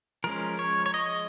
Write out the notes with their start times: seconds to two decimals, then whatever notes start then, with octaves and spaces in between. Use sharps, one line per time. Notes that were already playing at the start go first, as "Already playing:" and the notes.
0.24 F3 G#3 C#4 A#4
0.59 C#5
0.86 C#5
0.94 D#5